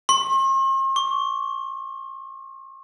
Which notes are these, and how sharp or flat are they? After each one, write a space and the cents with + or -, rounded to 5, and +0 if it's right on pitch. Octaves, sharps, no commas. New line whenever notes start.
C6 +45
C#6 +35